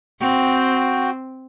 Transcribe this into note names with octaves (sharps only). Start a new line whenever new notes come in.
C4 F#4 G5